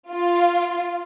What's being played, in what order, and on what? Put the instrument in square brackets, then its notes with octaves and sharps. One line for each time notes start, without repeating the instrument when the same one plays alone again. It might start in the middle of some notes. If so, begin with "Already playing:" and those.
[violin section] F4